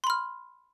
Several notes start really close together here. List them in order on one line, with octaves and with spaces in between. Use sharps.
C6 B5 F6